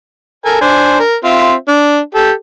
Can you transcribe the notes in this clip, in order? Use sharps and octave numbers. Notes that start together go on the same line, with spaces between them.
A4 A#4 G#5
D4 C5 G#5
A#4
C4 F4 E5
D4
G4 A4